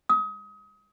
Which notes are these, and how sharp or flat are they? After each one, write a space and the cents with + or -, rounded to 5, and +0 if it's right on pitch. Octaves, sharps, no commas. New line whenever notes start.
D#6 +30